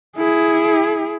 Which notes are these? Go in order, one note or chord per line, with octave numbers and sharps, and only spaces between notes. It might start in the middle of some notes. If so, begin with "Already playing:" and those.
E4 G#4